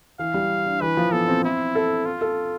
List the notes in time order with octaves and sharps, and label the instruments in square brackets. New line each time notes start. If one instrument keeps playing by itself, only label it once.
[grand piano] E3 [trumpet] F5
[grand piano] G3
D4
[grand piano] E3 [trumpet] B4
[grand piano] F3
[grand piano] B3 [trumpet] A4
[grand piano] C4
[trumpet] E4
[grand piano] A4
[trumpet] F4
[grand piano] A4